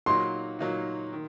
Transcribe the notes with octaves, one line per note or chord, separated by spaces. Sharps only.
A#2 F#3 A#3 D#4 F#4 C6
A#2 F#3 A#3 D#4 F#4
D#3